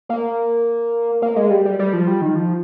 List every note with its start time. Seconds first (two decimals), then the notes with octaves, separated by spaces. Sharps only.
0.09 A#3
1.22 A#3
1.36 G#3
1.50 G3
1.65 G3
1.79 G3
1.93 F3
2.07 G3
2.21 D#3
2.36 F3